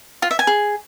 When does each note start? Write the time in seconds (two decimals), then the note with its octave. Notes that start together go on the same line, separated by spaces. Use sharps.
0.22 F4
0.31 E5
0.39 G#5
0.47 G#4